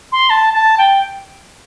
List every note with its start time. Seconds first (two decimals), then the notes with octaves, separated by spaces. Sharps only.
0.12 C6
0.29 A5
0.53 A5
0.78 G5